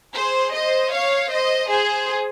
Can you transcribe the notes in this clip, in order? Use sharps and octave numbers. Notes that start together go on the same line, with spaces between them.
G#4 C5
C5 D#5
C#5 F5
C5 D#5
G#4 C5